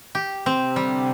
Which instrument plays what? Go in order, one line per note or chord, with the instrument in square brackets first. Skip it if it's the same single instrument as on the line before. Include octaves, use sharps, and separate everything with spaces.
[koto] G4
[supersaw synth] C3 [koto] C4
[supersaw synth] D3 [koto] G3